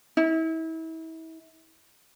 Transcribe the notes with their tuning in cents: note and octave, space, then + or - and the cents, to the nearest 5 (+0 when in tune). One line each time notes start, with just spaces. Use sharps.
E4 -35